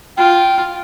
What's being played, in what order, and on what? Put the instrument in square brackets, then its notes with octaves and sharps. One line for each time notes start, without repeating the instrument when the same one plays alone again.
[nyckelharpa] F4 [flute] G5